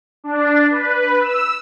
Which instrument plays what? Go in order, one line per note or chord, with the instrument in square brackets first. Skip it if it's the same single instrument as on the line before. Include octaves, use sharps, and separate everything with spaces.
[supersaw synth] D4
B4
E6